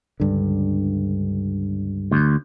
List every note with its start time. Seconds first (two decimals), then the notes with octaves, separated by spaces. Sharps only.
0.20 C#2 G2 D3
2.11 D2